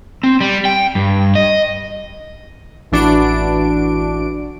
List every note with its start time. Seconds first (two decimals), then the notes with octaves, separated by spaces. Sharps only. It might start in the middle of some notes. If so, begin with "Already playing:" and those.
0.23 C4
0.41 G3
0.65 G5
0.95 G2
1.35 D#5
2.92 A1 E3 D4 F#4 D7